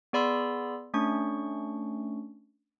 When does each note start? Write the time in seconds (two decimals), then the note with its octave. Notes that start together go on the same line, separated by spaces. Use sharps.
0.13 B3 G#4 D5 B5 C6 E6
0.94 A3 C#4 D4 C#6